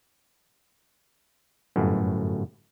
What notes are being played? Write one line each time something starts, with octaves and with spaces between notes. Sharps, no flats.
G1 F#2 A2